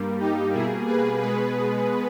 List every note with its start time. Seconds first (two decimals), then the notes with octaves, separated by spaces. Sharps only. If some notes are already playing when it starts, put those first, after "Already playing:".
Already playing: G2 G3 A#3
0.19 D#4 G4
0.53 B2 G3 A#3 E4 G#4
0.87 G#4 B4
1.21 B2 G#3 B3 G#4 B4